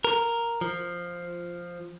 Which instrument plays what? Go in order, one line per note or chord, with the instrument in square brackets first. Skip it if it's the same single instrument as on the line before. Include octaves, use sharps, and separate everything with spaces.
[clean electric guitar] A#4
F3